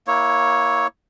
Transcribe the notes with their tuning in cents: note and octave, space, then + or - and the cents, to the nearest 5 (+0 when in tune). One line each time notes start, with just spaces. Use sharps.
A#3 +15 E4 -10 C#5 +0